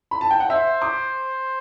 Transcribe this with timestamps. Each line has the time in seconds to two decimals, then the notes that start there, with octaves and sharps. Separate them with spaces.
0.11 B5
0.21 A5
0.31 G5
0.40 F#5
0.49 C5 E5
0.82 D6